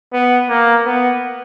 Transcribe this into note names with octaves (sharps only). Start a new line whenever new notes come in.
B3
A#3
B3